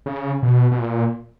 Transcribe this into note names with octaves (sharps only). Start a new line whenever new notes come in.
C#3
B2
B2
A#2